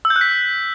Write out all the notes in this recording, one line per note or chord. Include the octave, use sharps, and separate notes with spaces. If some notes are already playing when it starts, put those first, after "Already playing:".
E6
G6
F#6
B6